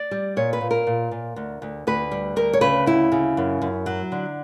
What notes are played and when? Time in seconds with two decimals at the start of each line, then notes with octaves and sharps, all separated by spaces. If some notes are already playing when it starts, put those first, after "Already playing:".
Already playing: D5
0.11 G3
0.37 A#2 C#5
0.53 B4
0.61 A#2
0.71 A#4
0.87 A#2
1.11 A#2
1.36 D2
1.62 D2
1.87 D2 B4
2.11 G3
2.36 D2 A#4
2.53 C#5
2.61 C#3 B4
2.86 D2 E4
3.12 C#3
3.37 F#2
3.62 F#2
3.86 F#3
4.12 D3